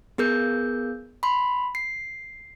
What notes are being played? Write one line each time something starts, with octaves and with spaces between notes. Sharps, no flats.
B3 G#4 A#4 G6
B5 C6
C7